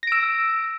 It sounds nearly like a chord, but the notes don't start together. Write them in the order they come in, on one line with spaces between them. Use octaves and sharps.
A#6 D7 E6